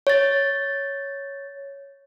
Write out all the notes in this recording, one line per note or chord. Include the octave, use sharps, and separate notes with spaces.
C#5 A6